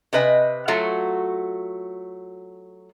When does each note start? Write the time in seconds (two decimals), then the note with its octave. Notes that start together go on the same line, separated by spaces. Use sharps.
0.13 C3 C4 B4 D#5 G#5
0.68 F#3 A3 F4 F#4